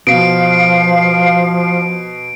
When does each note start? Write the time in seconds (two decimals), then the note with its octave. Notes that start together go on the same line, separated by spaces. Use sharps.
0.07 B2 F3 F5 C7 D7